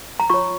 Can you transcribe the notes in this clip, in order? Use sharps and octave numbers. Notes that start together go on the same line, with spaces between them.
A#5
F4 C#5 C#6